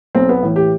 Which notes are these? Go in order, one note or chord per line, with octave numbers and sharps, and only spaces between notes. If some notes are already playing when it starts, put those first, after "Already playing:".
B1 C4
B3
A2 E3
G4